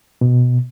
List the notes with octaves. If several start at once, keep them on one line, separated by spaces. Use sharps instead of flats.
B2